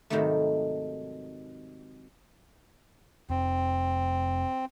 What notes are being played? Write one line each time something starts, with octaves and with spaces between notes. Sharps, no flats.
G#2 C3 D#3 F#3 G3 A3
F1 C4